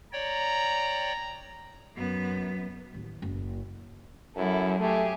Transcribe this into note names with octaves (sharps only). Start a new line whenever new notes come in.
C#5 D5 G5 A#5
F#2 B3
A1 D#2
F#1
F#2 F#3 E4 A4
A3 G4 G#4